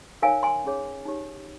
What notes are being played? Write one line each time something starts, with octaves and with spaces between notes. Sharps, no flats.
D#4 A#4 C#5 F5 G#5
G#5 C6
C#4 G#4 C#5
D#4 G4 C#5